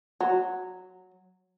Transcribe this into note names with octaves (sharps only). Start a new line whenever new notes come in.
F#3